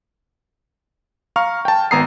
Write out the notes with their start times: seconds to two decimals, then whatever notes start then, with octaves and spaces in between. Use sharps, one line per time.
1.36 F5 A#5 C#6 F6
1.65 G5 A5
1.91 G#1 B3 A#5 D#6 C7